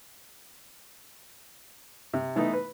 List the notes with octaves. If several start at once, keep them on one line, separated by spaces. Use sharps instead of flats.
C3
E3 A3 B3 D#4
B4